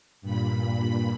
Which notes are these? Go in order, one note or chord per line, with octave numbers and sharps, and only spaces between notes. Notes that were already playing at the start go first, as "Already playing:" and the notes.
G2 A#2 B5